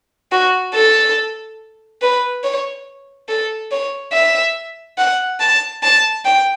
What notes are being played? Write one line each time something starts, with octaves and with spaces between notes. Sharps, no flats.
F#4
A4
B4
C#5
A4
C#5
E5
F#5
A5
A5
G5